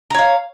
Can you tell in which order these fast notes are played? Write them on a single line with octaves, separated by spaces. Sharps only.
A#5 C#5 F5